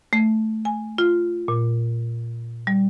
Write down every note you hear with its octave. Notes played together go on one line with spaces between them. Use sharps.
A3
G#5
F4
A#2
G3